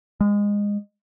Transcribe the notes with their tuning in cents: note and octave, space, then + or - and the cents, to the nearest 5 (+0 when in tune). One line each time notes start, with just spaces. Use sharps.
G#3 -20